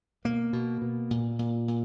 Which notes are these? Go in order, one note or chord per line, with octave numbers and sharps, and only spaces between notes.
B2 A#3
B2
B2
A#2
A#2
A#2